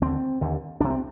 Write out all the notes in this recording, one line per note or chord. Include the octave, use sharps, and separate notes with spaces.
D#2 D3 C4
D#2 D3
C2 C3 D4
C4